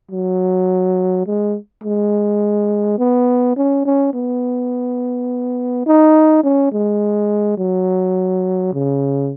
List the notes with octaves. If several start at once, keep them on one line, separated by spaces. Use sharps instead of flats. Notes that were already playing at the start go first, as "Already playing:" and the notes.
F#3
G#3
G#3
B3
C#4
C#4
B3
D#4
C#4
G#3
F#3
C#3